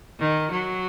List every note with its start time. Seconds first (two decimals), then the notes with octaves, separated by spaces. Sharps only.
0.19 D#3
0.52 F#3